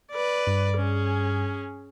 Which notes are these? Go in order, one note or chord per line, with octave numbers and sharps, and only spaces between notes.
B4 D5
G2
C#4 G#4